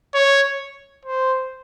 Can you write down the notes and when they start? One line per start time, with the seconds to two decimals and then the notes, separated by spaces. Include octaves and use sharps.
0.14 C#5
1.05 C5